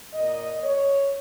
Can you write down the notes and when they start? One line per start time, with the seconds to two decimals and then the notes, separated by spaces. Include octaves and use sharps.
0.14 A#2 A#3 D#5
0.64 C#5